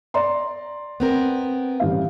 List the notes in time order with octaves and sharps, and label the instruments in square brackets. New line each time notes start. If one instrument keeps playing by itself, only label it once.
[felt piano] D5 A#5 C6
[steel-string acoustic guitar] B3 C4 A#4
[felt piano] A1 G3 F5